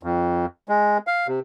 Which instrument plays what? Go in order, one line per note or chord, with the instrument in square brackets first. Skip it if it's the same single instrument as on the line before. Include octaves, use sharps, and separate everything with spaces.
[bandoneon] F2
G#3
F5
C3